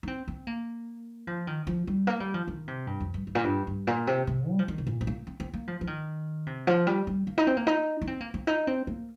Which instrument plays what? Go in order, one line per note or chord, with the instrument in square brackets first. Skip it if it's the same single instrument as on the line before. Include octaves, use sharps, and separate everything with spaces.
[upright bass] D#4
C4
C4
A#3
F3
D#3
F3
G3
A#3
G3
F3
D#3
C3
G2
F2
G2
G2
A#2
G2
G2
A#2
C3
C3
G3
F3
D#3
C3
A#2
C4
A#3
C4
C4
A#3
F3
F3
D#3
C3
F3
G3
G3
A#3
D#4
C4
A#3
D#4
D#4
C4
A#3
C4
D#4
C4
A#3